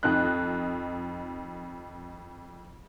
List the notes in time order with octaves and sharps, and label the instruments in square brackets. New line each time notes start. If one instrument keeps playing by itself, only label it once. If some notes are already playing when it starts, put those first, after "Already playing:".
[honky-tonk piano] F2 D#4 F#6